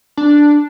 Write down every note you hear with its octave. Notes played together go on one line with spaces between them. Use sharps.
D4